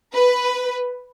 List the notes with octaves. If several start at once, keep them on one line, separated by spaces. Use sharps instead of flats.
B4